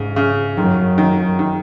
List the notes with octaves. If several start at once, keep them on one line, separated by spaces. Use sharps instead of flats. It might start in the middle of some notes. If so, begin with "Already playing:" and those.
Already playing: G#2 C#3
C#3
F#2 D#3
D#3
D#3